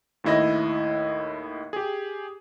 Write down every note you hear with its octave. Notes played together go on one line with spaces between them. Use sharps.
D#2 A2 E4 D#5 A#6
G4 G#4